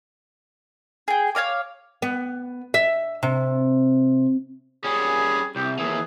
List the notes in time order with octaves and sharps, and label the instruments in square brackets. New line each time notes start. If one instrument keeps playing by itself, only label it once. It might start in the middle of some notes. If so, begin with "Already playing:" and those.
[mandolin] G#4 G5
C#5 D#5 F5 D6
[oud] B3
E5
C3
[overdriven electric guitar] G3 C#4 [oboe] G#4
[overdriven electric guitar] C2 [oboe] G4
[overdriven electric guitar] D#2 E3 [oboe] G#4